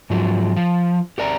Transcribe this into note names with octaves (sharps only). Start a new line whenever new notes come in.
G#2 F3 F#3
F3
G4 A#4 D5 A#5